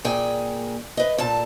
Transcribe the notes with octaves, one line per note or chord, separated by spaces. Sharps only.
A#2 G#4 G5 G#5
B4 D#5
A#2 A4 A5